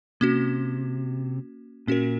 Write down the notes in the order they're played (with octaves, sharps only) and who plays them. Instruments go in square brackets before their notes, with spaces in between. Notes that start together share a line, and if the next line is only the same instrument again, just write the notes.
[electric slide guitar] C3 [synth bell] A#3 C#4 F#4
[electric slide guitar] A#2 [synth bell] C#4 F#4 A#4